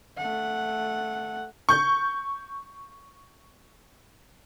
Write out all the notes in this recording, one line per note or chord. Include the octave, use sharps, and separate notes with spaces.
A3 F#5
C#6 G6